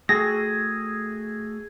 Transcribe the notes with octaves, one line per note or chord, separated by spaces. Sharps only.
A3 F#4 G#4 A4 A#6